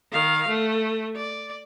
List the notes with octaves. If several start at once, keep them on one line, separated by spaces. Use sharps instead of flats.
D#3 F5
A3
D5